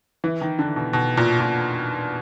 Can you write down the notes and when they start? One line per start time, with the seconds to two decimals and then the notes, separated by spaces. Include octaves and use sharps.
0.24 E3
0.41 D#3
0.59 D3
0.76 B2
0.93 B2
1.17 A#2
1.40 A#2